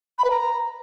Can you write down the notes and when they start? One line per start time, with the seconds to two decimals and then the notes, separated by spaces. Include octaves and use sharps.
0.18 B5
0.24 B4
0.30 A#5